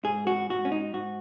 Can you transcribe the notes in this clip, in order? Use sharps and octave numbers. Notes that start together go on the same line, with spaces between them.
G#2 G#4
F#4
G#2 F#4
C#4
D#4
G#2 F#4